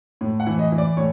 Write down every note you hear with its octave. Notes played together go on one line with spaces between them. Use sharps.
A2
F#5
E3
D#5
E3
D5
A2 C#5